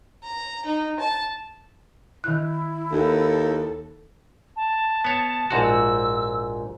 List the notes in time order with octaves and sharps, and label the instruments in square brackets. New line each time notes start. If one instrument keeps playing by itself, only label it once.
[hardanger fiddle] A#5
D#4
A5
[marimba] D#3 F#6 [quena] E4
[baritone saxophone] D#2 [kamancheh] A4
[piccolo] A5
[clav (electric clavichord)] B3 C#5
A#1 G#2 F#4
[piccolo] E6